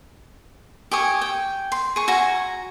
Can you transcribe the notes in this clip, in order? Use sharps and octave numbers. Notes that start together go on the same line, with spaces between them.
G4 G#5 C#6 D#6
G5
C6
G#4 C#6
F#4 G#5 A#5